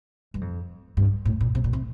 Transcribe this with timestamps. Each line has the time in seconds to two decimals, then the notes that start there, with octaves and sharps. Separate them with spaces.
0.34 G2
0.41 F2
0.97 G2
1.25 A2
1.41 A#2
1.55 C3
1.64 A#2
1.73 C3